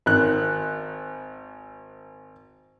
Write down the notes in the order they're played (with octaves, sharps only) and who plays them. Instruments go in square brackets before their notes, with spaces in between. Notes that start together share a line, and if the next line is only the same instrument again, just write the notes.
[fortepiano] G#1 D#3 F#6